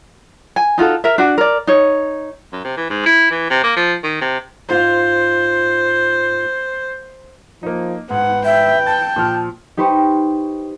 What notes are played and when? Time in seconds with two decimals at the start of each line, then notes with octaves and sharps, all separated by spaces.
0.56 G#5
0.78 D#4 F4 F#4 A4
1.04 A#4 E5
1.18 D4 F#4
1.38 A#4 D5
1.67 D#4 C#5
2.53 F#2
2.64 C3
2.77 E3
2.90 G#2
3.06 E4
3.31 E3
3.50 C3
3.63 A#3
3.76 F3
4.03 D#3
4.21 C3
4.69 G#2 F4 C5
7.63 F3 A#3 D#4
8.10 G#2 B4 F#5
8.45 E5 G5
8.86 A5 A6
9.16 A#2 F3 F6
9.77 D#4 G4 B4 C5 C#6